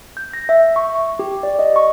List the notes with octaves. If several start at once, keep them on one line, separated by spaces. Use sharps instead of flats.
G6
A#6
E5
C#6
G4
D5
D#5
C#6